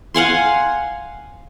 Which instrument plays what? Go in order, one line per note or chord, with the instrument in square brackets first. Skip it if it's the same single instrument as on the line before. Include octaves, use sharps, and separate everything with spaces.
[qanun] F5 F#5 G#5 C6